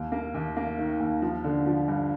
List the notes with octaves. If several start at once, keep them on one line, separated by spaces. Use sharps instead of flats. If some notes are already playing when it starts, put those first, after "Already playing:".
Already playing: D#2
A#3
D#2
A#3
D#3
D#2
F3
D3
F3
G2